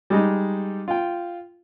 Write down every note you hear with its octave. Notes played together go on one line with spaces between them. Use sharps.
G3 G#3 D#4
F4 G5